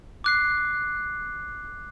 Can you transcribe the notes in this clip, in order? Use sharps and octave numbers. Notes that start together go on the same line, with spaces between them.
D6 F#6 C7